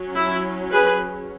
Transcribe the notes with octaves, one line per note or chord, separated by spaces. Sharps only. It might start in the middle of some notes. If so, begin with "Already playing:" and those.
Already playing: F#3 C#4
E4
G#4 B4